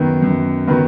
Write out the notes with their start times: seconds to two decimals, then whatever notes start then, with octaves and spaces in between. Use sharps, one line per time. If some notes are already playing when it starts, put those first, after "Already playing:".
Already playing: F#2 D#3 F#3 B3
0.22 F#2
0.67 D#3 F#3 B3